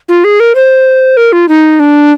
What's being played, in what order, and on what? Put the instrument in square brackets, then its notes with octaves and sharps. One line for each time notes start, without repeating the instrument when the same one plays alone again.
[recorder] F4
G#4
A#4
C5
A#4
F4
D#4
D4